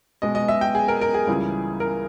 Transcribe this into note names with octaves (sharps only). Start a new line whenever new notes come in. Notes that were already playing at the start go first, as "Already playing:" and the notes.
B2 G#3 B3 D#5
D#5
E5
G5
G#4
A#4
A#4
G#4
C#2 C#3 E3 G3
A#4